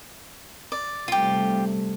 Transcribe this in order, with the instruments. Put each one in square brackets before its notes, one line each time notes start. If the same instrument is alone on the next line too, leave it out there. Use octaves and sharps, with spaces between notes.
[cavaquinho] D5
[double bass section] C3 G3 A3 [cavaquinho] F4 G4